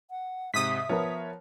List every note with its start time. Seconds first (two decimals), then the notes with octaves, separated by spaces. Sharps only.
0.10 F#5
0.54 G#2 C3 E5 D#6 B6
0.89 F3 B3 A#4 C#5